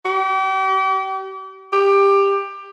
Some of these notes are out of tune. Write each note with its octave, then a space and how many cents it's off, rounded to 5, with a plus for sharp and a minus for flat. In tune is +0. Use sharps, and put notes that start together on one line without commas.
G4 -40
G4 +15